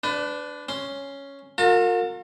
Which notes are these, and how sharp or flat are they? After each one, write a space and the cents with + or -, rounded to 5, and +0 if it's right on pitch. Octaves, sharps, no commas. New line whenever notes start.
D4 -5 B4 +30
C#4 +0 C6 +0
F4 +45 A#4 -35 A5 +35